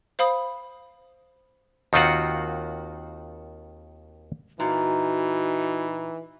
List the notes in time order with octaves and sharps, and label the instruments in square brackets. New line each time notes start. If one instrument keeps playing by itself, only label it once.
[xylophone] C5 F5 B5 D#6
[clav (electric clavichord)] D#2 D#3 C4 F4 F#4 F#5
[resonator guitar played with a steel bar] A#2 [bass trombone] E3 [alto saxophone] D#4 [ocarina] F#4